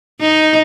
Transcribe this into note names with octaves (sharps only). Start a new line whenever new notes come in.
D#4